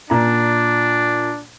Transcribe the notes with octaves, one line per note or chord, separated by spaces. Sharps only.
A#2 D4 A#5